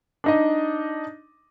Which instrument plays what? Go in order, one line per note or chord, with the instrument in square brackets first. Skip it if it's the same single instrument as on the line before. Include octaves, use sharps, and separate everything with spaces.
[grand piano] D4 D#4 D#5